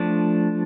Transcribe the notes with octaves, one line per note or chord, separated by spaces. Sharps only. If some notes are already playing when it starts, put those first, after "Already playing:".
Already playing: F3 A3 D4